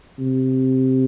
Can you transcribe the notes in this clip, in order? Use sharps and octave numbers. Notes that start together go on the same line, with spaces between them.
C3